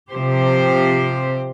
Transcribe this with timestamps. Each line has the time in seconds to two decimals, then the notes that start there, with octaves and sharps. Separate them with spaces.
0.11 C3 F3 C4 G4 C5